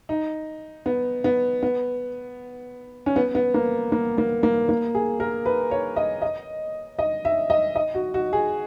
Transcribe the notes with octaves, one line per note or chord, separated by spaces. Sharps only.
D#4
B3
B3
B3
C#4
B3
B3
A#3
A#3
A#3
A#3
A#3
G#4
A#4
B4
C#5
D#5
D#5
D#5
E5
D#5
D#5
F#4
F#4
G#4